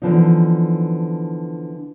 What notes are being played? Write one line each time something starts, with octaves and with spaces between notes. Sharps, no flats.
D3 E3 F3 B3 D#4